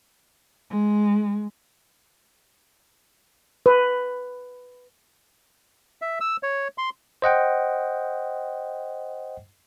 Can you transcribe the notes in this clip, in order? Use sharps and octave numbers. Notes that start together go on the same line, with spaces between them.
G#3
B4
E5
E6
C#5
C6
C5 D#5 F#5 G5